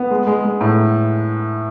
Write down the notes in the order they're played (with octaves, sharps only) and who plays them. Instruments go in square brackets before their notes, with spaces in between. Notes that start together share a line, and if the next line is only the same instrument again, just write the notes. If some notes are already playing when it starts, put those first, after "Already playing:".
Already playing: [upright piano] B3
G#3
G#3
G#3
A2